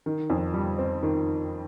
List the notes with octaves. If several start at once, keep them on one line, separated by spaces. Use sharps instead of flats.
D#3
F2
G3
C4
D#3